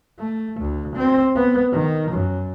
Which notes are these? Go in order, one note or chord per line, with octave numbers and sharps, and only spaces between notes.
A3
D2
C4
B3
D#3
F#2